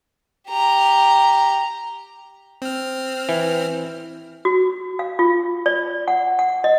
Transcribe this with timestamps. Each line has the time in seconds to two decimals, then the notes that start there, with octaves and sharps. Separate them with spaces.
0.49 G4 A#5
2.62 C4 F6
3.29 E3
4.45 F#4
4.99 F5
5.19 F4
5.66 D5
6.08 F#5
6.39 F#5
6.64 D#5